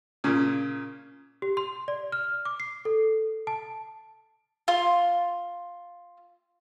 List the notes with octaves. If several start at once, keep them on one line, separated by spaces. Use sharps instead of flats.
A#2 C#3
G4
C6
D5
F6
D6
C7
A4
A5
F4 C6